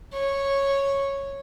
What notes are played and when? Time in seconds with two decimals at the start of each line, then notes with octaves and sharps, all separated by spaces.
0.13 C#5